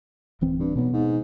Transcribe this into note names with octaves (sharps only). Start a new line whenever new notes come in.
D1 E3 C4
G2
B1 B2 B3
G#2